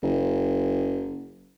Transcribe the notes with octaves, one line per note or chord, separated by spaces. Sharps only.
F#1